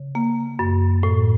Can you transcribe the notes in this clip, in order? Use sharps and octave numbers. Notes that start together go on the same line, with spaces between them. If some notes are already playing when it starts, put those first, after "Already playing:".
Already playing: C#3
A#3
F#2
A2